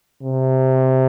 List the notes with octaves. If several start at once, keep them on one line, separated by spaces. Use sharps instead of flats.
C3